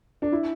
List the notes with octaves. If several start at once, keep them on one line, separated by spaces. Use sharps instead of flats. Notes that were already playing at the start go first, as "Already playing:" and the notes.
D4
E4